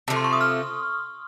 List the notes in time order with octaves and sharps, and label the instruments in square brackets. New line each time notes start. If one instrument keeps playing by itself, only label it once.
[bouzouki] C3 F3 A3 [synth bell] A5
[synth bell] C6
C#6
D#6
F6